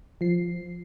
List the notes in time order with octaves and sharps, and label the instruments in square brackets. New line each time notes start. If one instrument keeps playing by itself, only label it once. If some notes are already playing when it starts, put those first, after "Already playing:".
[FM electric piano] F3 C7